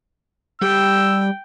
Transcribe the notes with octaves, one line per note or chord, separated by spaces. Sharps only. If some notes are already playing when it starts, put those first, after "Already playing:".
G3 G5 E6